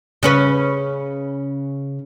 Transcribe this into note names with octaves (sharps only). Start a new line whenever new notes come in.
C#3 C#4 B4